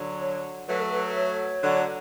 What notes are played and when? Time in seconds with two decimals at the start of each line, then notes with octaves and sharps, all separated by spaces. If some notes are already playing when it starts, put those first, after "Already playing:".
Already playing: D3 F#3
0.21 C#5
0.68 F#3 A3 B4
0.80 A4
0.93 B4
1.16 C#5
1.63 D3 F#3